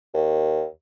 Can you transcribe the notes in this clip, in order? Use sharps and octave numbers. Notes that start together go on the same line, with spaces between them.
D#2